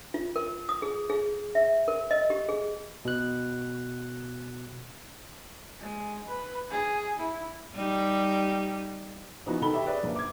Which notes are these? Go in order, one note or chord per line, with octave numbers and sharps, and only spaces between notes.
F4
A#4
D#6
G#4
G#4
E5
A#4
D#5
G4
G#4
B2 F#6
G#3
B4
G#4
E4
G3 D#4 G4
E3 F3 B3 D#4 F#4 B4
D#3 A4 B5 G7
G4 C#5 E5
G#4 B4 D5 E5
A#1 F#2 A#3
D6 G#6